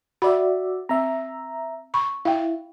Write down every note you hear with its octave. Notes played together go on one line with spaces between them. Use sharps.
F#4 D5 E5 B5
C4 E5 A#5
B5 C#6
E4 F5 G5